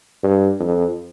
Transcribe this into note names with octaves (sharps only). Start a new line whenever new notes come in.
G2
F2